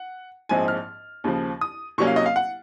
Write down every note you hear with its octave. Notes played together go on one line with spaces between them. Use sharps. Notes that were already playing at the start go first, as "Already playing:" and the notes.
Already playing: F#5
A#1 G#2 F3 C4 G#5
F6
D#2 C#3 F3
D#6
C2 C3 F#3 A#3 C#4 C#6
F5
D#5
F5
F#5